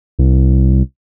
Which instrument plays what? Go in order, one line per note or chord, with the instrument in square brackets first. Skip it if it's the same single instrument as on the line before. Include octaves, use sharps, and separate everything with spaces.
[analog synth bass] C2